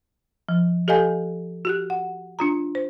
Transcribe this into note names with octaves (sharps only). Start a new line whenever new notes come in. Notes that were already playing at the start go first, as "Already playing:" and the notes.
F3
G4 A4 D#5 F5 G#5 G6
F#4 G4 F#6
F#5
D4 F4 A#5
C5